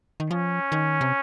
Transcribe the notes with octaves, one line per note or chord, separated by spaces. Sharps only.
D#3
F3 C#4
D#3
C3